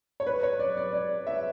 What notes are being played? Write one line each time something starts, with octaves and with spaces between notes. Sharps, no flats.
C#5
B4
C#5
D5
D5
D5
E5